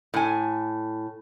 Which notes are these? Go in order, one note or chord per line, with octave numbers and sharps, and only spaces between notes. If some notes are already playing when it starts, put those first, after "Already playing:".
A2 G#5